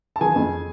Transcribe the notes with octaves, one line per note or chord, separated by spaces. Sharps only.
A5
E3 G#4 G#5
F2